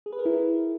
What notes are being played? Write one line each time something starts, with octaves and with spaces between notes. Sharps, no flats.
G#4
B4
A#4
E4